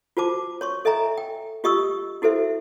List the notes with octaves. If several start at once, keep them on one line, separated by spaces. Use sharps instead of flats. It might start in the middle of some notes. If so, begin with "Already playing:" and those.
F4 F#4 C5 A5 D6
C#5 C6 C#6
A4 D#5 E5 G#5 A#5
G5
F4 G4 D#5 C#6 D#6 E6
E4 F#4 A4 C5 E5